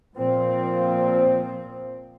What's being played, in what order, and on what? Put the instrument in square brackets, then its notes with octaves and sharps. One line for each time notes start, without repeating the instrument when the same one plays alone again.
[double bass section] A#2 F3 C4